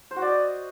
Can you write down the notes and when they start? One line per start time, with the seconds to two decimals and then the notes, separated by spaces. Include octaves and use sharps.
0.11 C5
0.16 F#4
0.22 D5
0.27 D#5